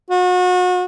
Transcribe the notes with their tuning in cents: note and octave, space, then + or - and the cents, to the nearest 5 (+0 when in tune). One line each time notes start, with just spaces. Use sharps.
F#4 -35